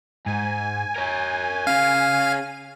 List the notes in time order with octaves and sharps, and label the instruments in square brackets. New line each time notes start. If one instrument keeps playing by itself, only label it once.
[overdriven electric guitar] G#2 [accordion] G#5
[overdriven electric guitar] A#4 C#5
[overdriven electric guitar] C#4 G#4 [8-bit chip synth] F5